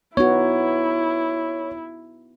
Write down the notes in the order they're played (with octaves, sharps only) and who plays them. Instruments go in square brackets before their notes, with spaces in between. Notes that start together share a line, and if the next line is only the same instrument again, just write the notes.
[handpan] B3 D#4 F#4 [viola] E4 [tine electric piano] C#5